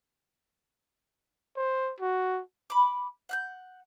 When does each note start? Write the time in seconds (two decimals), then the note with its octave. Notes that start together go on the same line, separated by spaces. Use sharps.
1.57 C5
2.01 F#4
2.70 B5 D6
3.29 F#5 F#6 G6